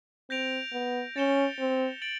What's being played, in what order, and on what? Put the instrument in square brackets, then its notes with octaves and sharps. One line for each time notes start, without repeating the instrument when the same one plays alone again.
[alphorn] C4 [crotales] G6 A#6 D7 F7
[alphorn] B3
[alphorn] C#4 [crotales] A6 C#7 E7 G7
[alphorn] C4
[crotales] A6 D7 F#7